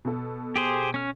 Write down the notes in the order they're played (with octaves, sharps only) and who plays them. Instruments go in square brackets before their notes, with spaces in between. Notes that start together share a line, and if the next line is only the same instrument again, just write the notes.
[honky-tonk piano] B2 A4
[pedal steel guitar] G4 G#4 C5
C#4 F6